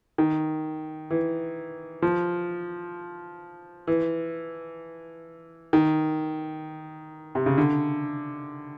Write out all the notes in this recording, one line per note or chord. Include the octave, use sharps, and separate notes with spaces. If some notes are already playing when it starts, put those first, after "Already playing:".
D#3
E3
F3
E3
D#3
C3
C#3
D3